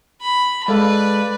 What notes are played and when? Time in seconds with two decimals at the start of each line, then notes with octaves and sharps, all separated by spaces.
0.21 B5
0.68 G#3 A4 B4 D5 F5